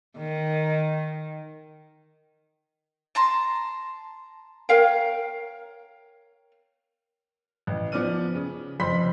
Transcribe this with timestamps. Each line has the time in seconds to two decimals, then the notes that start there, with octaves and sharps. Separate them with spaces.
0.17 D#3
3.15 A5 A#5 C6
4.69 A#4 C#5 F5 G5
7.67 A1
7.92 F3 B3 D5 D6 F6 D#7
8.35 C#3
8.80 F1 F2 C5 B5 C6 B6